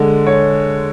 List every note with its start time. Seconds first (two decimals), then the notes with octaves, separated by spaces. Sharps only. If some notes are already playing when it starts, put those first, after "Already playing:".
Already playing: D3 G#3
0.27 C#5